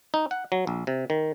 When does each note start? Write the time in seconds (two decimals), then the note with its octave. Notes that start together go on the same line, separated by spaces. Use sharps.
0.14 D#4
0.31 F#5
0.52 F#3
0.67 A#1
0.87 C3
1.10 D#3